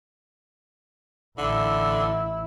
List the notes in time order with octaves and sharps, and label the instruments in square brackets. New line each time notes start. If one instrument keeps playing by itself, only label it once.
[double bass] A1 E4 [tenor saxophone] D3